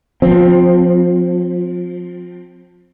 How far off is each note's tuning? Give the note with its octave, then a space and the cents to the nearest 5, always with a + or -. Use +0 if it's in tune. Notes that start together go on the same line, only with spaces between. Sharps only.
F3 +25 C4 +0